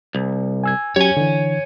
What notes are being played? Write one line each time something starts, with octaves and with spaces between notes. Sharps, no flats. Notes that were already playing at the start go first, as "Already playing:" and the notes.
C2
G#5 E6 G#6
F#3 C#4 G4 C#5 G#5
D3 E3